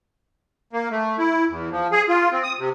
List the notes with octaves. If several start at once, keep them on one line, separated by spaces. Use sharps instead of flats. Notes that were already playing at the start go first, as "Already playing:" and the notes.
A#3
A3
E4
E2
F3
G#4
F4
C4
D#6
C3